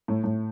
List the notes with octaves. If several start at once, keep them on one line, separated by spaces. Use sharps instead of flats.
A2
A2